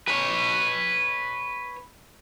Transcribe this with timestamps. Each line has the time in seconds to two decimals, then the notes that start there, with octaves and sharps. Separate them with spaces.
0.08 B4 C#5